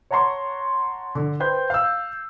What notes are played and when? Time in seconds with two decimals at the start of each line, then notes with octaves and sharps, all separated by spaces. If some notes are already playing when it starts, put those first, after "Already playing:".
0.11 C#5 F#5 A5 A#5 C6 C#6
1.15 D3
1.40 B4 C5 G5 G6
1.70 F5 E6